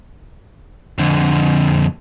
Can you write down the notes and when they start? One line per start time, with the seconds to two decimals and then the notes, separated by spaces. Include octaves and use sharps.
0.99 F2 D3